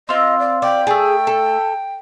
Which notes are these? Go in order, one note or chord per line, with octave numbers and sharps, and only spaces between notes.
C4 F4 D#5
D5
D5 G5
A3 G#4 A5
A4